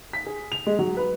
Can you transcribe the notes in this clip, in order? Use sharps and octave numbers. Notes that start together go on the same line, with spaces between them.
B6
G#4
F7
G#3
F#3
B4